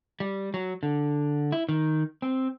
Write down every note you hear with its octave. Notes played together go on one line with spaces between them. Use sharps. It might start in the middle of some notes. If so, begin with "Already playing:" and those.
G3
F#3
D3
E4
D#3
C4